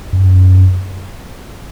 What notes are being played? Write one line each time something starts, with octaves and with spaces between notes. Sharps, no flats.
F#2